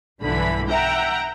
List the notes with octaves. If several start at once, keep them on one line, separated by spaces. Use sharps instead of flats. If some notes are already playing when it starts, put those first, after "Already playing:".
B1 G2 D3 E3 B5
E5 F#5 G5 A#5